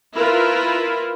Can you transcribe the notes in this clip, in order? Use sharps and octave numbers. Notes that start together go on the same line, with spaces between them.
E4 F4 A#4 B4